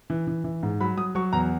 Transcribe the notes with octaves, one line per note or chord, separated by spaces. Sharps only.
E3
E3
E3
G#2
F#3 B5
F#3 D#6
F#3 C#6
E2 A#5